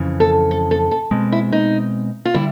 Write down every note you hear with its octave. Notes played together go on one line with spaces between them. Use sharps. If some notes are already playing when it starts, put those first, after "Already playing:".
Already playing: F2 C#3 E3
A4
A4
A4
A4
B2 G#3 C4
E4
D#4
F4
D3 G3 E4